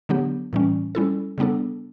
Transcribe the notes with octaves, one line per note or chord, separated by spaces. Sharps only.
D3 F#3 B3 D4 G4
A2 E3 G3 C#4
G3 C#4 E4 A4
C#3 G3 B3 D4 A4